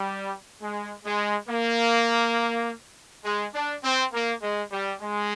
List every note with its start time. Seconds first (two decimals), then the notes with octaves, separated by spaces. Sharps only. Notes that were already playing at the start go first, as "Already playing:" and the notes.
Already playing: G3
0.61 G#3
1.05 G#3
1.49 A#3
3.25 G#3
3.55 D4
3.84 C4
4.13 A#3
4.42 G#3
4.72 G3
5.01 G#3